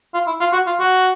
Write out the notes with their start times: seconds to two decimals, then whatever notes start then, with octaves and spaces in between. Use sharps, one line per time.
0.14 F4
0.27 E4
0.40 F4
0.53 F#4
0.67 F4
0.80 F#4